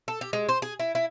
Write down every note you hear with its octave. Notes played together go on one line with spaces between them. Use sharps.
A4
G4
G#3
C5
G#4
E4
E4